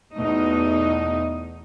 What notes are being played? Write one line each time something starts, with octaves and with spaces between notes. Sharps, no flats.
E2 B2 A3 D#4 D#5